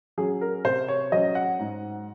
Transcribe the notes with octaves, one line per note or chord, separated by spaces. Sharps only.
F#3 C#4 G#4
A#4
C3 C5
C#5
F#3 C#4 D#5
F#5
G#2